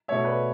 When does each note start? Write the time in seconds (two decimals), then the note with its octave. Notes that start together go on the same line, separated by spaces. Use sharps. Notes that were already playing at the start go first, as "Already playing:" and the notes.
0.08 B2 A3 C#5 E5
0.24 B4 D5